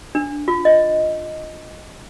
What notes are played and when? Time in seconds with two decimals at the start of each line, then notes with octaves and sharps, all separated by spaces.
0.15 D4
0.48 F4
0.65 D#5